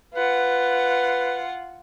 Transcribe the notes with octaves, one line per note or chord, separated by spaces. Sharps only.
F4 B4 F#5